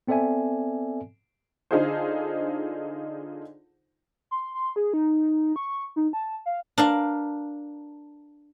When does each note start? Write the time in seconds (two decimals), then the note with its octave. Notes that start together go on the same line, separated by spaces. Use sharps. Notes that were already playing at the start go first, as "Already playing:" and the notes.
0.07 B3 C4 A4 D5 E5 G#5
1.71 D3 D#4 F4 G#4 A4 C5
4.31 C6
4.55 C6
4.76 G#4
4.94 D#4
5.56 C#6
5.96 D#4
6.13 A5
6.46 F5
6.78 D4 A#4 F5